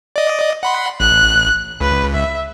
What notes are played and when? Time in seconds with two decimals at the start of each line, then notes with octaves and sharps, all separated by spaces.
0.16 D5 D#5
0.63 F#5 B5 C6
1.00 A1 F#6
1.81 C#2 B4
2.14 E5